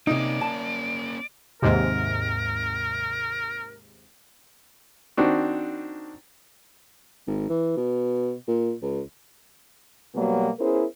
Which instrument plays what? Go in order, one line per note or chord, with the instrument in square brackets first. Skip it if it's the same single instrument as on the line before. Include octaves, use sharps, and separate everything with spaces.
[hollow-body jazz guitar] C3 D#4 [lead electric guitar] A#3 C#4 [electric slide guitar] D5
[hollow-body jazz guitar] A5
[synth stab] D#2 G#2 C3 [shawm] A#4
[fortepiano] D#3 C4 D4 F#4
[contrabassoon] G#1
E3
B2
A#2
C#2
[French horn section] B2 F#3 G3 A#3 B3
B3 C#4 E4 G#4 A#4 C5